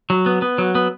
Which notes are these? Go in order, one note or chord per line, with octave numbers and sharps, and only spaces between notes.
F#3
B3
B3
F#3
B3